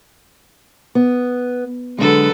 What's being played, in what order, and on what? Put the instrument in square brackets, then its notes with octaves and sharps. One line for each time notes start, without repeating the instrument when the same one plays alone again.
[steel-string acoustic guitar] B3
[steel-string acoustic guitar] D3 G#3 [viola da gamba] F#3 A4 B4